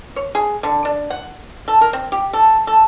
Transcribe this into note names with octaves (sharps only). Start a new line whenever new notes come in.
C#5
G#4
D3
D4
F#5
A4
A#4
C4
G4
A4
A4